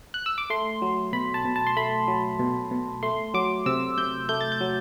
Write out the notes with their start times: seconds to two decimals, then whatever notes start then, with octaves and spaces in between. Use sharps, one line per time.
0.14 F#6
0.26 E6
0.38 D6
0.50 A3 C6
0.82 F#3
1.13 B2 B5
1.34 A5
1.45 B2
1.56 A5
1.67 C6
1.76 A3 B5
2.08 F#3
2.39 B2
2.71 B2
3.03 A3 C6
3.34 F#3 D6
3.66 C3 E6
3.98 C3 G6
4.29 A3 G6
4.41 A6
4.52 G6
4.61 F#3